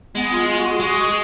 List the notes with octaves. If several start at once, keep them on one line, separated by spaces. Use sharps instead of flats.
G#3 B3
F4
F4
F#4
G#4
G#3 F#4